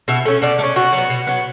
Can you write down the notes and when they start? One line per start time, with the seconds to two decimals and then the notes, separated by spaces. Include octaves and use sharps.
0.08 B2 E5
0.25 A3 C#4
0.42 B2 D5
0.59 A3
0.63 C#4
0.76 B2 F#4
0.93 F#3 B3
1.10 B2
1.27 F#3 B3